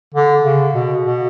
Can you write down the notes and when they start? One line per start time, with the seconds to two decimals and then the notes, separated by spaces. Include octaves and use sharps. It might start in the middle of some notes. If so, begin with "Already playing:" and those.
0.14 D3
0.44 C#3
0.75 B2
1.05 B2